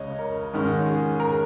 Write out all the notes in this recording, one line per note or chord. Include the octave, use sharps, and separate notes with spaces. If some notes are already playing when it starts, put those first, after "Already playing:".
Already playing: C#2 C#3 G#3 C#5 D#5
A#4
G#2 D#3 G#3 C#4
G#4
A#4